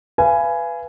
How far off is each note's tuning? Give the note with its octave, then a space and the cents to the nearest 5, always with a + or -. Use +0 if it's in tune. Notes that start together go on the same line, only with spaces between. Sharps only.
B4 +5 F5 -40 G#5 +5